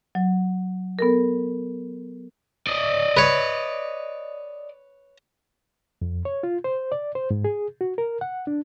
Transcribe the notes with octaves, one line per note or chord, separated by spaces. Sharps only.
F#3
B3 A4 A#4
D5 D#5
B4 C#5
F2
C#5
F4
C5
D5
C5
G#2
G#4
F#4
A#4
F#5
D4